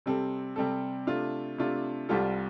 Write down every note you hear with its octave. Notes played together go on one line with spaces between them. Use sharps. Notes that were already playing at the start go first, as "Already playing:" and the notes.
C3 G3 C4 A4
C3 G3 C4 A4
C3 A3 D4 F4
C3 A3 D4 F4
C2 C3 G3 F4 A4